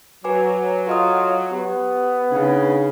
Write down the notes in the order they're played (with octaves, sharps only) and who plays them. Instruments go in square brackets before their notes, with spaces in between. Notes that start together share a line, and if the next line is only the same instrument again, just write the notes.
[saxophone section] F#3 [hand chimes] B4 G#5 D6
[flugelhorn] F4 [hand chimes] A4 D#5 D#6
[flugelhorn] B3 [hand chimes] G4
[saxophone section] C#3 [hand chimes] D4 D#4